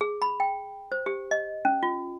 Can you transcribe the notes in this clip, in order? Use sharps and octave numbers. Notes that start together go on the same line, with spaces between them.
G#4
B5
G5
C5
G4
D#5
C#4
F4